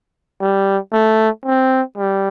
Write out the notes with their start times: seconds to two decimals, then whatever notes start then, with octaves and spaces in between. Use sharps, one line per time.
0.41 G3
0.92 A3
1.45 C4
1.97 G3